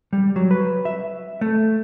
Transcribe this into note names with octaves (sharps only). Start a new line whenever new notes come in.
G3
F#3
B4
E5
A3